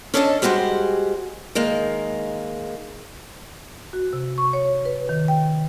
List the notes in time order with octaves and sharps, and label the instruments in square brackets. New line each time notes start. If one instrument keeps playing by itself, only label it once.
[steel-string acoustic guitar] C#4 D4 A4 D#5 G#5 A5
G3 G#3 F#4 G4 C5
D#3 G#3 A#3
[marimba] F#4
C3
C#6
C#5
B4
D#3
G5